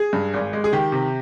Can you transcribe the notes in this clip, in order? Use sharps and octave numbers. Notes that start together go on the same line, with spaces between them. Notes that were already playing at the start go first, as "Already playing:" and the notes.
Already playing: G#4
G2
G#1
G#3
G#4
D#3 G4
C3